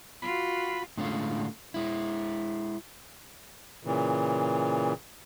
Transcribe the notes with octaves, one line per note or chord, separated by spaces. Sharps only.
F4 F#4 B5
A2 D3 G#3 A3 C#4 F4
G#3 E4
A#2 C#3 E3